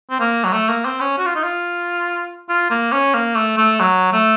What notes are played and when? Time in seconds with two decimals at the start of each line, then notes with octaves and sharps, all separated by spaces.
0.11 C4
0.20 A#3
0.45 F#3
0.53 A3
0.69 A#3
0.85 C4
1.01 C#4
1.18 F#4
1.26 F4
1.36 D#4
1.44 F4
2.49 F4
2.70 A#3
2.92 C#4
3.14 A#3
3.36 A3
3.58 A3
3.80 F#3
4.13 A3